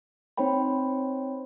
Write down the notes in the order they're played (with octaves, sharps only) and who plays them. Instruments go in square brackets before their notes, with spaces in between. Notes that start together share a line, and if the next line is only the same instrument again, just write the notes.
[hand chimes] C4 D#4 C5 C#5 G5 B5